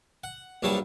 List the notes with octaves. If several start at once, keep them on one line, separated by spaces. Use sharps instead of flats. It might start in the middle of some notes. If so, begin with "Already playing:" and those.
F#5
A#1 G2 F#3 G3 C#5 A5